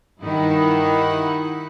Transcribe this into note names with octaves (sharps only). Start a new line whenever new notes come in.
G2 D#3 D#4 E4 F#5